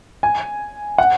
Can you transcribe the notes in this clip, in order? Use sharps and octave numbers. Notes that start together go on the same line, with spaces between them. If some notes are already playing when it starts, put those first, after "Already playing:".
G#5
F#5